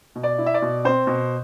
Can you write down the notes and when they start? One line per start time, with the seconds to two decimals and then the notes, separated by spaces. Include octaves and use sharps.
0.15 B2
0.23 D5
0.38 E4
0.46 E5
0.54 D5
0.62 B2
0.85 C4 C5
1.07 B2